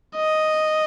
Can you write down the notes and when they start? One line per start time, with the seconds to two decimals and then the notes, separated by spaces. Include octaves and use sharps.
0.16 D#5